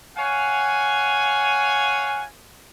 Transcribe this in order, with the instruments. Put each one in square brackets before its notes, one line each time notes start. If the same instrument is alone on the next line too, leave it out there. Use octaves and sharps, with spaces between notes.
[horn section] C#5 F5 F#5 G#5